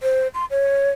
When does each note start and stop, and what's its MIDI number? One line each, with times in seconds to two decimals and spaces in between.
0.03 0.28 72
0.34 0.45 84
0.51 0.91 73